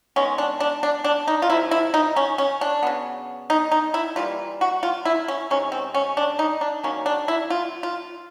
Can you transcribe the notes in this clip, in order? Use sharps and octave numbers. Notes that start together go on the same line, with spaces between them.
D#3 G#3 B3 C#4
D4
D4
D4
D4
D#4
F4
C3 F3 A#3 E4
E4
D#4
C#4
C#4
D4
C#3 F#3 B3
D#4
D#4
E4
E3 G3 A#3 F4
F#4
F4
E4
C#4
C3 D#3 G#3 C#4
C4
C#4
D4
D#4
D4
D#3 F#3 A#3 C#4
D4
E4
F4
F4